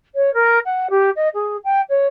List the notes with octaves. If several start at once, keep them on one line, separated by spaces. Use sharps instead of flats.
C#5
A#4
F#5
G4
D#5
G#4
G5
C#5